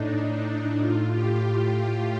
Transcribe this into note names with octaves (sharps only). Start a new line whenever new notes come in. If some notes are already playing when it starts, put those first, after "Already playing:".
Already playing: A2 D4 D#4
D#4
A2 F4
G4
F4
F4